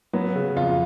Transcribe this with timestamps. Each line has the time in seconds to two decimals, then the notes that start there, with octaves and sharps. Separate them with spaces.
0.13 F#3 B3
0.35 C#3
0.56 F2 F4